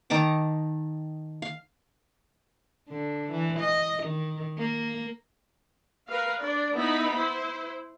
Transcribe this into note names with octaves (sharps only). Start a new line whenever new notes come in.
D#3 A5 A#5 D6
F5
D3
E3
D#5
D#3
A#3
A#4 B4 F5
D4 D5
B3 D#4 E4 B5
E4 C5